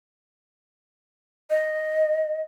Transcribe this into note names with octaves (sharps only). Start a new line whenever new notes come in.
D#5